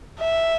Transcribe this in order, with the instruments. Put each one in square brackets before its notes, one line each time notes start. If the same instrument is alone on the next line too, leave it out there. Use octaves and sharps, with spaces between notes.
[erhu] E5